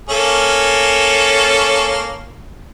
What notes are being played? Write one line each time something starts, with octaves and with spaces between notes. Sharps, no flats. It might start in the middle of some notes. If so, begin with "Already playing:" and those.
A#3 C#4 A4